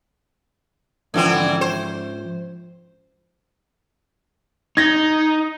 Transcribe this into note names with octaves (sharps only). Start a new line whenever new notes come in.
G#2 D3 E3 F3 C4 C#4
C5
D#4 G#6 A#6